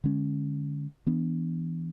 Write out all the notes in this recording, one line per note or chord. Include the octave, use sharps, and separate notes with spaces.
D3 G#3 C#4
E3 B3 D4